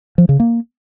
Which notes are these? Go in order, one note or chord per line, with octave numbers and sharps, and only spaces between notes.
F3
C#3
A#3